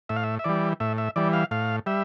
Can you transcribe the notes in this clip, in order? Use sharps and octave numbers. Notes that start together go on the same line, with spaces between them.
A2 E5
F5
E5
E5
E3 G3 D5
A2 E5
E5
E3 G3 D5
F5
A2 F5
G3 E5